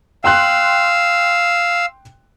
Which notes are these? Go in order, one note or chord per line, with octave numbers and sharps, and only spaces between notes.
F5 G5 C6 E6 F#6